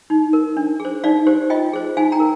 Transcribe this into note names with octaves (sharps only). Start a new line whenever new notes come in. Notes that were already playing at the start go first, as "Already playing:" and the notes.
D#4
A#4
D4
G#4
C5
D#4 D5 F5
G4 C5
F4 D#5 G5
G#4 C5
D#4 F5 G#5
G5 A#5
A#4